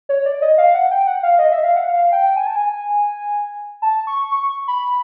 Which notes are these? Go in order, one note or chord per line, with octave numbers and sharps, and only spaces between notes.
C#5
D5
D#5
F5
F#5
G5
F#5
F5
D#5
E5
F5
F#5
F5
G5
G#5
A5
G#5
A5
C#6
C#6
C#6
B5